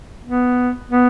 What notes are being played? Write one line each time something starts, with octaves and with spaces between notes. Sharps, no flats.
B3
B3